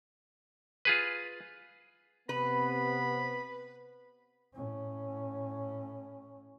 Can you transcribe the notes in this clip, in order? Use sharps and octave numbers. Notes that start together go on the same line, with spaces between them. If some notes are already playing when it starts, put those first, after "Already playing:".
F4 G#4 B4
C3 B3 C4 B4 B5
A2 C#4